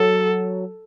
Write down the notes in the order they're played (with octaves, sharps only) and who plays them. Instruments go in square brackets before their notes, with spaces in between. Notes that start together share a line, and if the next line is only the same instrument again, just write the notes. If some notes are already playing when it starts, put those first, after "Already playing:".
Already playing: [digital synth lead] F#3 [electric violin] A4